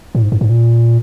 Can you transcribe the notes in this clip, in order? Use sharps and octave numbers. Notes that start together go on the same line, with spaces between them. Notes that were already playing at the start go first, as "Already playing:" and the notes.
A2
G#2
G2
G#2
A#2